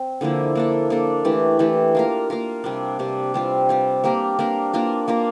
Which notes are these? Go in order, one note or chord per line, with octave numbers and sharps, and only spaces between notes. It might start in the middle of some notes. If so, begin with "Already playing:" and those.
Already playing: C4
D3 F3 A#3 E4
A#3 D4 A4
A#3 D4 A4
E3 A3 D4 G4
E3 A3 D4 G4
A#3 F4 A#4
A#3 F4 A#4
C3 G3 D4
C3 G3 D4
G3 C4 F4
G3 C4 F4
A#3 D4 G4 A#4
A#3 D4 G4 A#4
A#3 D4 F4 A#4
A#3 D4 F4 A#4